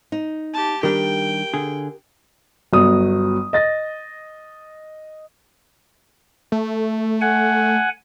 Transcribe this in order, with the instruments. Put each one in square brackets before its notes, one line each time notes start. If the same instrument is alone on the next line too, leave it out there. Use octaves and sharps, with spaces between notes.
[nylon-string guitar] D#4
[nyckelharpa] G4 A5
[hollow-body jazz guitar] D#3 G3 D4 [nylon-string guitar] G4 A#4 [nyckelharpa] G5
[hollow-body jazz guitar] D3 G#4
[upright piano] G1 F#3 B3 D#6
D#5 A6 A#6
[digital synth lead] A3
[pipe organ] F#5 G#5